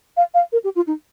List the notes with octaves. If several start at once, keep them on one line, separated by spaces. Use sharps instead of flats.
F5
F5
A#4
G4
F4
D#4